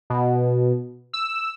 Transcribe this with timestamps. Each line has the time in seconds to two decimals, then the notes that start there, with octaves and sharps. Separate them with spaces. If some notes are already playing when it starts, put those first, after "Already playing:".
0.10 B2
1.13 E6